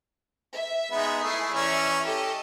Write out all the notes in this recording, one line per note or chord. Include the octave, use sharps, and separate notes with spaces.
E5
G#3 B3 D#4
A3 E4 G#4 C7
E3 C#4 D5 E5 A#5
G4 A4 D#5